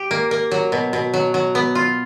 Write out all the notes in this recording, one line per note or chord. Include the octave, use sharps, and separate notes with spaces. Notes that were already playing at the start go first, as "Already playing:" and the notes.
Already playing: G4
A#3
A#3
F#3
B2
B2
F#3
F#3
B3
F4